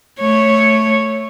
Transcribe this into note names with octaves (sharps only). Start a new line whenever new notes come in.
A3 C#5